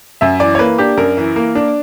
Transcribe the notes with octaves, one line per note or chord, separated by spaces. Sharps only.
F#2 E5
E3 D5
C#5
A#3 B4
D4 G4
F#2 A#4
E3
A#3
D4